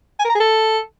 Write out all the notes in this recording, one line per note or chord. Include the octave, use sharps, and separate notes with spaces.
G#5
A#4
A#5
G#4
A4